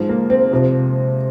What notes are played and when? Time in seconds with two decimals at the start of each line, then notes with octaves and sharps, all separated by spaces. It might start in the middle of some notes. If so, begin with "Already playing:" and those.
Already playing: G#2 F3
0.09 A#3
0.30 C4
0.51 F2 C3 F3